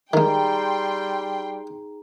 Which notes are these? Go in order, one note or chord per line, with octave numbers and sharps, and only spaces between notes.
D#3 G3 G#3 D#4 G#4 G5 A#5 C6